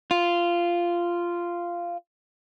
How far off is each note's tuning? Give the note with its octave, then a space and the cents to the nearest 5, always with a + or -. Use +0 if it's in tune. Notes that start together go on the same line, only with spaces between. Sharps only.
F4 -10